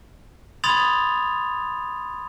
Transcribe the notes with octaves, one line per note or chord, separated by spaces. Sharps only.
B5 C6 D#6 G#6 A6 F7